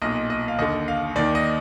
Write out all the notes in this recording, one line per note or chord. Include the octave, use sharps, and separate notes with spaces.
B1 A#2 D#5
D#5
F5
D#2 D3 D#5
F5
D#2 D#3 D5
D#5